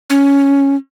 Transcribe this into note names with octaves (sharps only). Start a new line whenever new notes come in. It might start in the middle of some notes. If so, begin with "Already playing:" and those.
C#4